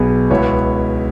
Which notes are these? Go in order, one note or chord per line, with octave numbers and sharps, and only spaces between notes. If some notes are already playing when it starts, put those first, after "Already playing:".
Already playing: B1 B2 B3 G#4
C#2 B2 B3 E4 C#5